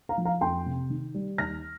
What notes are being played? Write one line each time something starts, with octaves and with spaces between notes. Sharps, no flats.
F5 A#5
F3
F5 A#5
F2 G5 C6
C3
D#3
G3
D#2 F6 A#6